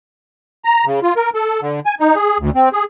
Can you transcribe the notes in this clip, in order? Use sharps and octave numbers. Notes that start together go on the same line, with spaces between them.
A#5
C#3
F4
A#4
A4
D3
G#5
D#4
G#4
D2
C4
G#4